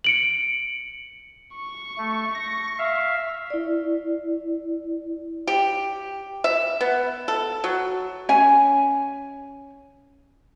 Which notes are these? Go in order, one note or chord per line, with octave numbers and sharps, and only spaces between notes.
C#7 D7 F#7
C#6
A3
A#6
E5 F5
E4 D5
G4
E5
B3
A4
F#3
C#4 G#5